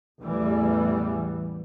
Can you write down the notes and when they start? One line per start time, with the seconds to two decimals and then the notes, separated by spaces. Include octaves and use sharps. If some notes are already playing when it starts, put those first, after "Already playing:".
0.20 A1 E2 E3 G3